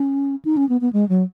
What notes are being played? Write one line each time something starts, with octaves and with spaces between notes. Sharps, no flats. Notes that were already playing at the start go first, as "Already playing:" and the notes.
Already playing: C#4
D#4
C#4
B3
B3
G#3
F#3